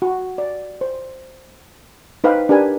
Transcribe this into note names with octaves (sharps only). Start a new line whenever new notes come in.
F#4
D5
C5
D#4 B4 C5 F5 G5
D4 G4 A#4 B4 G#5